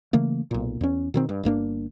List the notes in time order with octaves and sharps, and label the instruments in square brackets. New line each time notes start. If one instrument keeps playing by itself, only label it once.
[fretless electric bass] C#3 E3 A3 A#3
B1 A#2
E2 C#4
B2 D#3 C4
G2
G1 G2 A#3 D4